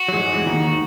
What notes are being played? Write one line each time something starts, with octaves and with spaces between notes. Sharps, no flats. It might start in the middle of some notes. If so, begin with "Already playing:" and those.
Already playing: F#4
F#3
G#2 G#3
E2 E3
D#2 D#3
D#2 D#3